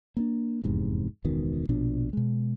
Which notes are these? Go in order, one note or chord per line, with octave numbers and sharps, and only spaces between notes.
A#3 C4 D4
F1 E2 G#2 C3
E1 C#2 B2 D#3
A#1 B2 F3 D4
B2 G#3